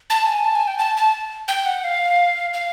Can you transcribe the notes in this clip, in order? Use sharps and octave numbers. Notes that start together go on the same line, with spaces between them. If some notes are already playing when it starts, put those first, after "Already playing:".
A5
G#5
A5
G#5
G5
A5
A5
G5
F#5
F5
F5